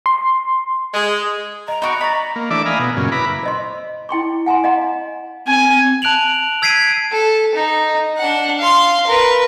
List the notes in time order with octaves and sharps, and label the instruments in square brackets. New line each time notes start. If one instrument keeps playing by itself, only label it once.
[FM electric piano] C6
[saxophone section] G#3
[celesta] D#5 [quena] A#5
[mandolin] D#4 F#4 D6 [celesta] B5 F#6
[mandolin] D5 B5 [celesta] D#5 C#6 A#6
[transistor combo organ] A#3
E3 A3 D4 D5 E5 D6
D#5 F5 G#5 A#5 B5
B2
F#2 A#2 C#3
E4 B4 A#5 B5 D6
[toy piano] C5 D#5 C6
E4 G5 C6 C#6
F#5 G#5 A#5 C6
D#5 F5 F#5 A#5 C6
[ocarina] C4 [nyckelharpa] G#5
[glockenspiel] A5 F#6 D7 F7 F#7
E6 G#6 B6 C7 D7 D#7
[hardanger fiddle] A4
D#4
D4 F#5
F5 C6
A#4 B4